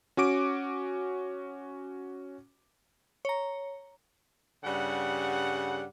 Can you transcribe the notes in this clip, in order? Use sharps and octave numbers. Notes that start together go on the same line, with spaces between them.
C#4 F#4 D6 D7
C#5 A#5
G2 C#3 G3 F#5